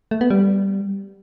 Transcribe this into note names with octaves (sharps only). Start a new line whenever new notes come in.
A3
B3
G3